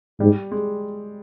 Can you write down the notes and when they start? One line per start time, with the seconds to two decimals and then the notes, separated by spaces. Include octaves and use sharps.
0.20 G#2 G3
0.52 G#3